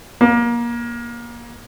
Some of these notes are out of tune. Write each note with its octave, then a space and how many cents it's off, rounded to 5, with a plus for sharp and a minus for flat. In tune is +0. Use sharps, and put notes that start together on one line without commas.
A#3 +25